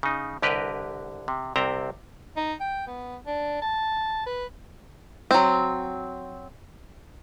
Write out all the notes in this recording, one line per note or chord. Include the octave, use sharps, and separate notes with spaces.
C#3 D#4
C2 D3 G4 A#4 B4 D#5
C3
C2 C3 C4 E5 G5 A#5
D#4
G5
B3
D4
A5
B4
F#3 C4